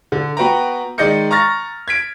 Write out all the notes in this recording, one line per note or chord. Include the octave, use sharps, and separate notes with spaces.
D3
B3 F#4 B4 G5 A#5
D#3 G#3 D5 D#5 G6 C#7
A#5 C#6 F6 A6 A#6
G#6 B6 D7